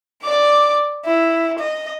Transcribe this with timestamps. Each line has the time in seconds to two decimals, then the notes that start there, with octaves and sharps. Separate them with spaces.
0.22 D5 D6
1.05 E4
1.59 D#5